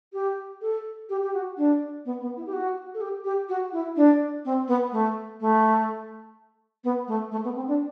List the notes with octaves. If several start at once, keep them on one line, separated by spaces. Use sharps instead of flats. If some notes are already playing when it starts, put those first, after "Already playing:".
G4
A4
G4
G4
F#4
D4
B3
B3
E4
G4
F#4
A4
G4
G4
F#4
E4
D4
C4
B3
A3
A3
B3
A3
A3
B3
C4
D4